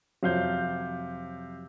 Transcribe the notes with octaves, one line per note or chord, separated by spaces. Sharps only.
F2 C3 F3 F#3 F5 G6